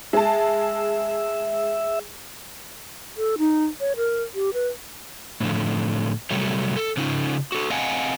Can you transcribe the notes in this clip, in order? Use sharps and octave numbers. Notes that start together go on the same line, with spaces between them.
G#3 E5 A5
A4
D#4
C#5
A#4
G4
B4
A2 D3 F3
C3 F#3 G3 A3
A4
C#3 C#4 D#4 F4
F#4 A4
C4 D#5 F5 F#5 G#5